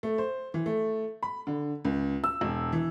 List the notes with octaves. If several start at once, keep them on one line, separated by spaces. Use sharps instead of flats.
A3
C5
E3
A3
B5
D3
C#2
E6
E1
E3